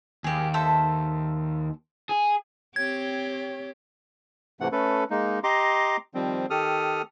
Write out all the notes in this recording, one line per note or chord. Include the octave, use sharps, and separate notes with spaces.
D#2 G4 G#4
A4 C5 E5
G#4
C4 G4 C#5 G#6
G#2 C3 E3 A3 F#5
A3 C#4 A4 B4
G#3 A#3 D#4
G4 D#5 A#5 C6 D6
D#3 F3 G3 C4
D#3 G4 A4 D#6 F6